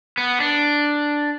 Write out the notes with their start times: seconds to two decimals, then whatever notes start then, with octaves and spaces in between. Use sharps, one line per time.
0.18 B3
0.40 D4